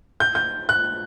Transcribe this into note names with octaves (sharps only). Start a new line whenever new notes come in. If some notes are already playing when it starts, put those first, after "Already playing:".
G6
G6
F#6